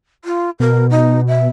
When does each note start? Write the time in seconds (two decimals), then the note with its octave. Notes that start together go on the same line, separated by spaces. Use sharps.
0.25 F4
0.60 B2 A#4
0.90 D#4
1.28 E5